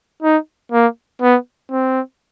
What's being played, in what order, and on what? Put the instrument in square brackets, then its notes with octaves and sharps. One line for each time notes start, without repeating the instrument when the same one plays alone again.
[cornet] D#4
A#3
B3
C4